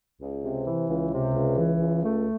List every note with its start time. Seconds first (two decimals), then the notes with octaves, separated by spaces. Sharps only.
0.21 C#2
0.44 C3
0.66 E3
0.90 C#2
1.12 C3
1.34 C#2
1.57 E3
1.79 C#2
2.03 A3